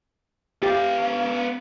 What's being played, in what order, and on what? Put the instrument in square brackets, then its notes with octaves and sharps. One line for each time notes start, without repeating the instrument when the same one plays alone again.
[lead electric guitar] B3 F5 [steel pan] G4